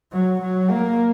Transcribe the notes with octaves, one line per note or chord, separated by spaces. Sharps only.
F#3
F#3
A#3